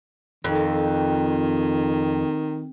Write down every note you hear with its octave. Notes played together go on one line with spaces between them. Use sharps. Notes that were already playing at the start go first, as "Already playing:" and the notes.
F2 D#3